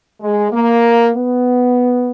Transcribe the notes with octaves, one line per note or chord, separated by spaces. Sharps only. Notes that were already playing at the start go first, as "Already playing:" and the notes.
G#3
A#3
B3